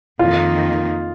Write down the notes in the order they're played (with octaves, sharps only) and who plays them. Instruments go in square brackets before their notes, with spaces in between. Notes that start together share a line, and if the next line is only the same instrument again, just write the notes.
[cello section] F2 D#3 A#3 D#4 [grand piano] F4